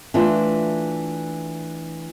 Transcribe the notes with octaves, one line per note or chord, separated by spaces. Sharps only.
E3 A3 D4 F4